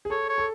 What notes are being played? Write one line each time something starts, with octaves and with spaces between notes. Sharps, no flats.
G#4
A4 C#5
C#5
A4